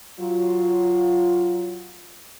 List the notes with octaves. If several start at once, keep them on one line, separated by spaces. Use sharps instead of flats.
F#3 F4